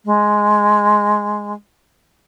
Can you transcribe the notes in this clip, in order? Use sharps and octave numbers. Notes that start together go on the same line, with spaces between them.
G#3